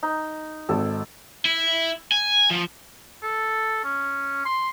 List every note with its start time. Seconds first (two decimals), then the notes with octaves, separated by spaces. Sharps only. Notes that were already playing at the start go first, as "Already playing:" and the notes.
0.03 D#4
0.69 G#1 A4
1.45 E4
2.12 G#5
2.50 F3
3.23 A4
3.84 C#4
4.46 C6